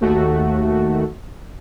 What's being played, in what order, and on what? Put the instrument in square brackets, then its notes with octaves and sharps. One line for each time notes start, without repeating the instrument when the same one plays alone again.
[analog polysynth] D#2 A3 F#4